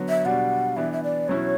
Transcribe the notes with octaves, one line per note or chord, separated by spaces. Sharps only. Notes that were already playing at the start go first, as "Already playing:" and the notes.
Already playing: D3 F#3 B3
E5
B2 G3 D4 F#5
E3 B3 D4 E5
E5
D5
B2 F#3 C#4 E4 C#5